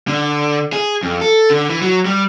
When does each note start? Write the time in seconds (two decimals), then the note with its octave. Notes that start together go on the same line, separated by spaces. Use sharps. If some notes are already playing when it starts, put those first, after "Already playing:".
0.08 D3
0.73 G#4
1.03 F2
1.21 A4
1.50 D3
1.70 E3
1.82 F#3
2.06 G3